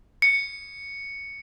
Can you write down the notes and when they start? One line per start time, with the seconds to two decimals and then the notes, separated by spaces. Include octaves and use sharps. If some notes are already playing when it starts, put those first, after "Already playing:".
0.22 C#7